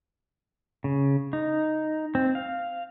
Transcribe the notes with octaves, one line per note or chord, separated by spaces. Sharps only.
C#3
D#4
C4
F5